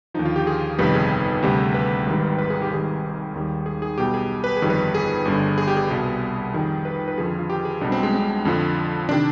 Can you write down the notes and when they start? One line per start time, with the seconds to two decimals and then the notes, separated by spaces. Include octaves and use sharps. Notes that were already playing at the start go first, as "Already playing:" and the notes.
0.14 D#2 D3 F3 D#4
0.25 F4
0.36 G4
0.47 G#4
0.79 G1 F2 C3 D#3 G3 B4
0.95 G#4
1.43 D2 C3 G3
1.74 B4
2.06 G#1 G#2 D#3 G3
2.38 B4
2.50 G#4
2.62 G4
2.70 G#1 G#2 D#3 G3 G#4
3.34 D#2 D#3 G3
3.66 G#4
3.82 G#4
3.98 B1 B2 G3 G4
4.14 G#4
4.44 B4
4.56 G#4
4.62 G1 F2 D#3 G3
4.70 B4
4.94 G#4
5.25 G1 G2 D3
5.58 G#4
5.67 G4
5.77 G#4
5.90 C2 B2 G3
6.54 F2 D#3 G3
6.85 B4
7.08 B4
7.18 F2 D3 F3 G#4
7.28 F4
7.39 F4
7.50 G4
7.65 G#4
7.81 B1 B2 G3 D4
7.92 C4
8.03 G#3
8.13 C4
8.45 F2 D3 F3
9.09 C3 D#3 D4